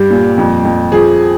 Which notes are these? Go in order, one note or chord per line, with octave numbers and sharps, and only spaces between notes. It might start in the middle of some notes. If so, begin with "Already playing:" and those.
Already playing: G2 G3 G4
A#2
F2
F2
F3 G#4